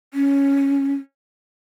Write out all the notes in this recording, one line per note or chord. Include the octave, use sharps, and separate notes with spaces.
C#4